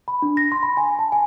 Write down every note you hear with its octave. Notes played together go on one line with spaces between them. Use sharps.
B5
D4
A#6
C6
B5
G#5
A5
G#5